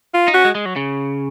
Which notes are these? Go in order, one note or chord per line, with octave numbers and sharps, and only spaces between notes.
F4
D#4
C#4 F#4
G#3
G#3
F#3
C#3